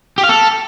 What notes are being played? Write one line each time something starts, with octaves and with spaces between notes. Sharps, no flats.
G4
F5
A4